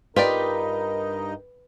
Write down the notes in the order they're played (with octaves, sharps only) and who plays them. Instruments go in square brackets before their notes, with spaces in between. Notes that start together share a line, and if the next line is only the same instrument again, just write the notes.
[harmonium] G2 D#4 D#5 [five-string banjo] F4 G4 D5 [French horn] A#4 [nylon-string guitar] B4